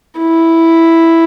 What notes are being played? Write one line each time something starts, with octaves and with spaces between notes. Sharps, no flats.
E4